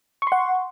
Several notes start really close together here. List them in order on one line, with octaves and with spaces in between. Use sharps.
C#6 C6 F#5